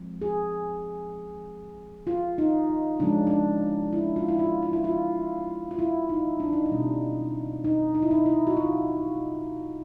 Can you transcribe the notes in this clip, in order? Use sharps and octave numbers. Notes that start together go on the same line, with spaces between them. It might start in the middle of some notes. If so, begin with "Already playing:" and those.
Already playing: F3 G#3 C4
G#4
F4
D#4
C#3 F3 G#3 C#4 D4
D4
E4
F4
E4
F4
F4
E4
F4
F4
E4
D#4
D4
D#4
D4
B2 G3 C4
D#4
D#4
E4
D#4
E4
F#4
F4